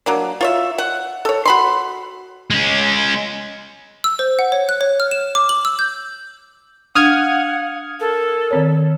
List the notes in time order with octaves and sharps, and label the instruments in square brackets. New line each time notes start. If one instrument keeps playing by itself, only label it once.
[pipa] F#3 A#3 D4
F4 C#5 E5
F#5
A4 C#5
F#4 B5 C6
[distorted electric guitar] G#3 C#4
[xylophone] E6
C5
F#5
C#5
F#6
C#5
F6
E7
D6
F#7
E6
G6
[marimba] D4 [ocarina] F5 [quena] F#5 [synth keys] D#6 F6 G#6
[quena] A4 [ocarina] A#4
[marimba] D#3 C4 C#5